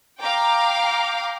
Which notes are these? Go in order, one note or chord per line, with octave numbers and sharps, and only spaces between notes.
F5 G5 A#5 D6